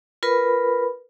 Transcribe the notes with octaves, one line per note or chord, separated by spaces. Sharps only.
F4 A#4 B4 B5